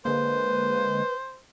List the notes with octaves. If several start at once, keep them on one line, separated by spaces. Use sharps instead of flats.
D3 G#3 A#3 B4 C5